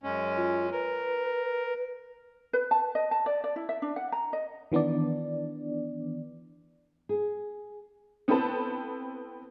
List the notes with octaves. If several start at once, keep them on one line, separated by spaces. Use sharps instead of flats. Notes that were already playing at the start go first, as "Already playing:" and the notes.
F#2 G#3 C#4
F4
A#4 B4
B4
A5
D#5
A5
D5
D5
E4
E5
D4
F#5
A#5
D#5
D#3 E3 B3 D4 D5
G#4
B3 C4 E4 A4 B4 A5